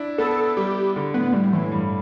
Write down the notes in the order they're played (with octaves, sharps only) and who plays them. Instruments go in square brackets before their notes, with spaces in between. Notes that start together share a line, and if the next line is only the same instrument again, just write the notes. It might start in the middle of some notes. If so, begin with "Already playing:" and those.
Already playing: [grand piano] D4 E4
[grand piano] B3 [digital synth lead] A4
[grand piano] G3 [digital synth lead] G4
[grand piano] D3
[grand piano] A2 [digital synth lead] B3
[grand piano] A2 [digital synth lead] G3
[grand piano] A2 [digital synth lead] E3
[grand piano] G2